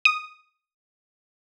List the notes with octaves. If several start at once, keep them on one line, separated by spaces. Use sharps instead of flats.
D#6